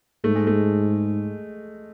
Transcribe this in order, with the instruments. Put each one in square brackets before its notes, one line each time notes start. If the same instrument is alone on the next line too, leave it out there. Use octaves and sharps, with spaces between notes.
[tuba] G#2 [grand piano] A3
[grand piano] G#3
A3